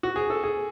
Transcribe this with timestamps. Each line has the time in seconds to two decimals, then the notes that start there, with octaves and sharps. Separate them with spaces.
0.03 F#4
0.16 G#4
0.30 A4
0.44 G#4